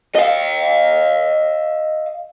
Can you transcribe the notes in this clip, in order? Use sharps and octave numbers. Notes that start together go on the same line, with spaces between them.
D#5 F5